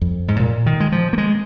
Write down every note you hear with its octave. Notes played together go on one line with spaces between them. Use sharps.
F2
G#2
A#2
D#3
G#3
F3
A#3
G#3